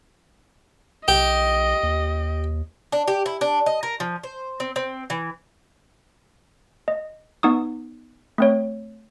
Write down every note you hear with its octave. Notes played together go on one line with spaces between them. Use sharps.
B1 G4 D#5
D#2
D4
G4
E4
D4
D#5
A#4
F3
C5
C4
C4
E3
D#5
B3 D#4 C#6 D#6
A3 C4 C#5